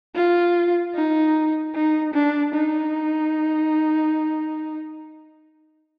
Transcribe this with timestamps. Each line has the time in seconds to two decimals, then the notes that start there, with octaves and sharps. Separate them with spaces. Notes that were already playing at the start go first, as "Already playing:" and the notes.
0.15 F4
0.95 D#4
1.75 D#4
2.14 D4
2.54 D#4